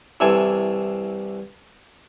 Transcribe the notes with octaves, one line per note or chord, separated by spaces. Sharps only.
C2 C3 E3 A4 G#5